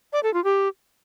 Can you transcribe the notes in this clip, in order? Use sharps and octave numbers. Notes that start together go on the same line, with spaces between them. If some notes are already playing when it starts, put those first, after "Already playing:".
D5
A4
F4
G4